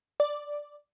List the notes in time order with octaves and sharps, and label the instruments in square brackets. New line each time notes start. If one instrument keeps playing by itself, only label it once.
[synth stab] D5